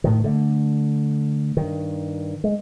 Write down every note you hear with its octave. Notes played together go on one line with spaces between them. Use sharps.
A2 D#3
D3 A3
G2 D#3
G#3